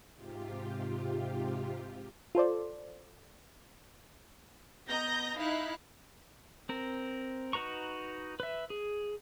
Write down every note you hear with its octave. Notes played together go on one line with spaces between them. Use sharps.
G#2 C3 F4 G4
F4 A4 C5 D5
B3 D#5 A#5 G6 A#6
D#4 E4 F5 F#6
C4 A#4
D#4 F#4 B4 A#5 C#6
B4 E5
G#4